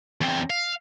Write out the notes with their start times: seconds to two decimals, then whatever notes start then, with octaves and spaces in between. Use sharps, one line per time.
0.21 E2 C4
0.50 F5